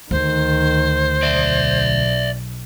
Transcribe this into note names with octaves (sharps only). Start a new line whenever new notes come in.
D2 D#3 C5
B1 D5 E5